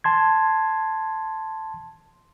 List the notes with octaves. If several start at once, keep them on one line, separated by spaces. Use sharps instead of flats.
A5 C6 G#6